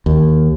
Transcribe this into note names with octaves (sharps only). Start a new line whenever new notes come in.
D#2